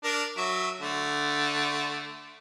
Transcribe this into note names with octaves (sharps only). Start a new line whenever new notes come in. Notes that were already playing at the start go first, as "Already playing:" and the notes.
D4 A#4
F#3 E5
D3 A3